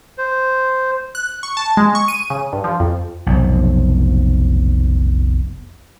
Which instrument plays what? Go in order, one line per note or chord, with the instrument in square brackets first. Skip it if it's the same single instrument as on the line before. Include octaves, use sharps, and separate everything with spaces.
[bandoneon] C5
[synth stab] F#6
C#6
A5
G#3
C#6
D#7
C#3
G2
F3
F2
[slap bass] F1 B1